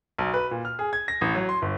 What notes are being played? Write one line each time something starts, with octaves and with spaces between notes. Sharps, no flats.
B1
B4
A#2
F6
G#4
G#6
A#6
A1
F#3
C6
G1